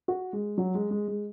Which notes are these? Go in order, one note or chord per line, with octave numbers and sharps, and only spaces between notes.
F#4
G#3
F#3
G#3
G#3
G#3